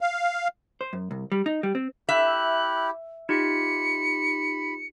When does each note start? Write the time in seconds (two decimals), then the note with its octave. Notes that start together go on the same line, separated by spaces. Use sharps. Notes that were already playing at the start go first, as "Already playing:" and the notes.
0.01 F5
0.81 C5
0.93 F#2
1.11 C2
1.32 G3
1.46 D#4
1.63 G3
1.75 C4
2.09 E4 G4 E5 F#6
3.29 D#4 F4 G4 B5 C#7